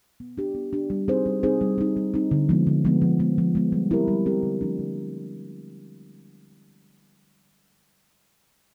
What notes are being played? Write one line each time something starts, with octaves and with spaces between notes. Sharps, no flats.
B3
D4 G4
B3
D4 G4
G3
C4 D#4 G#4 C5
G3
C4 D#4 G#4 C5
G3
C4 D#4
G3
C4 D#4
D3
F3 G#3 B3
D3
F3 G#3 B3
F3
G#3 B3
F3
G#3 B3
G3
C4 E4 G4 A#4
G3
C4 E4 G4 A#4
D3
F3 A3 D4
D3